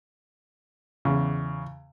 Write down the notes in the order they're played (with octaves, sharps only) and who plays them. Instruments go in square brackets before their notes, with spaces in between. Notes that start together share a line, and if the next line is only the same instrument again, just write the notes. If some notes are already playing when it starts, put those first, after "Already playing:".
[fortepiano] E2 C#3